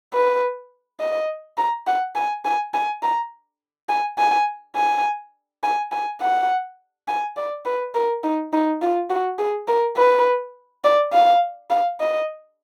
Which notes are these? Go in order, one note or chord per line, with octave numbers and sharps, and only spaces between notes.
B4
D#5
A#5
F#5
G#5
G#5
G#5
A#5
G#5
G#5
G#5
G#5
G#5
F#5
G#5
D5
B4
A#4
D#4
D#4
F4
F#4
G#4
A#4
B4
D5
F5
F5
D#5